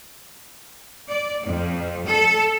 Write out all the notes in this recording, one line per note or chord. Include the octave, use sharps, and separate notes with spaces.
D5
F2
A4